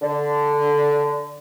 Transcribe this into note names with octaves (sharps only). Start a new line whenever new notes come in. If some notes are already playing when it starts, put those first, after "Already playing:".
D3